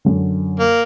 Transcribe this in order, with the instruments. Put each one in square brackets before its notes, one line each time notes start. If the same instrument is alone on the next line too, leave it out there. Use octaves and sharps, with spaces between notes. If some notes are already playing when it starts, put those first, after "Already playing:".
[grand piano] F#2 D3
[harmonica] A#3